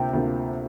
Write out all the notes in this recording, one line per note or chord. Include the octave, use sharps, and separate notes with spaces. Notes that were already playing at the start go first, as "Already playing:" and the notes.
Already playing: D2 C3 A#3 F4 G5
D2 C3 A#3 F4